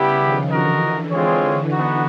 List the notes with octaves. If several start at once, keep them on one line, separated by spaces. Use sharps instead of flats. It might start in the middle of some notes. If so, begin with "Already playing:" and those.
Already playing: C#3 G3 B3 E4 G4
D#3 F3
D3 E3 F#4 A#4 D#5
D3
D3 E3 G#3 C4 F4 G#4 C#5
B3 D#4 F#4